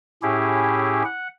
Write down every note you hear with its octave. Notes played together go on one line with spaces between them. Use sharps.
A2 C#4 E4 G4 G#4
F#5